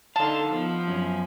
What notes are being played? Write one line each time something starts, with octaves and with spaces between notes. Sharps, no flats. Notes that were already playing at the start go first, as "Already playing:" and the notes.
D3 D#4 F5 A5 C6
F3 B3
F#2 C#4